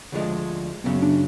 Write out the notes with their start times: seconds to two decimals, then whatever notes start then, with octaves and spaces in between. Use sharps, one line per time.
0.12 D2 D3 F3 G#3 D4
0.84 F#2 C#3 F#3 B3
1.02 D4